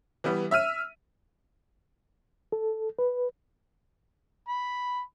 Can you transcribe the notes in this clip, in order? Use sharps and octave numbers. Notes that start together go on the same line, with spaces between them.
E3 G3 B3
E5 E6 F6 D#7
A4
B4
B5